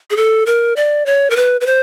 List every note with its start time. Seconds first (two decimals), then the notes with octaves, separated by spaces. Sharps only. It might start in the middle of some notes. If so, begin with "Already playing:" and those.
0.10 G#4
0.17 A4
0.46 A#4
0.76 D5
1.06 C#5
1.30 A#4
1.36 B4
1.61 B4
1.66 C5